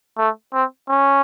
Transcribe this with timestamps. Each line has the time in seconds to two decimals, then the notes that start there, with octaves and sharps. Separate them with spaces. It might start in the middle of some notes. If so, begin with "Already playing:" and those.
0.18 A3
0.53 C4
0.89 C#4